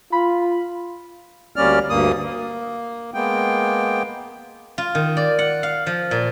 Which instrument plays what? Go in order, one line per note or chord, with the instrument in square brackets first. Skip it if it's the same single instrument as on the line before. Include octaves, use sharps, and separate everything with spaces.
[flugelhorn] F4 [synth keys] B5
[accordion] D2 G3 A#3 C#4 D5 F6
D2 G2 A#3 D#6
A#3
G#3 A#3 B3 G5
[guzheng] F4
D#3
D5
F#5
F5
F3
A#2